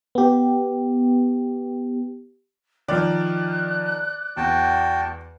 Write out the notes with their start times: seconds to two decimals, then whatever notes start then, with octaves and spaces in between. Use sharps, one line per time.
0.15 B3 G4
2.88 D#3 F3 D5 F#6
4.37 E2 F#4 G5 A5